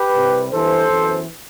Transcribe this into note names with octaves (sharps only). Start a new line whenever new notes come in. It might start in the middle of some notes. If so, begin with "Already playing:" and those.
Already playing: G4 B4
C2 C3 G3
G2 E3 B3 A4 C5
F#2 E3 B3